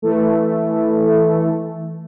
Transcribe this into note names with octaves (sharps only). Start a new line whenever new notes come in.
E3 A3